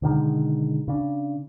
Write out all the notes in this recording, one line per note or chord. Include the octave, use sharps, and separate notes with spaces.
B2 D3 D#3 G#3
C#3 D4